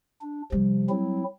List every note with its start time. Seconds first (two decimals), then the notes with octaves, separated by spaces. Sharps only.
0.22 D4
0.52 C3 F3 G3
0.89 F#3 C4 E4